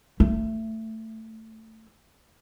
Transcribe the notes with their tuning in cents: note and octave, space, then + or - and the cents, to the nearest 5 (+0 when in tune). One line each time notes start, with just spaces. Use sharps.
A3 +15